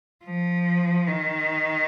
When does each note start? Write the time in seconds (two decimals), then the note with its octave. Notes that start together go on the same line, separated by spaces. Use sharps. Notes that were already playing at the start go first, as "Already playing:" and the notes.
0.24 F3
1.07 D#3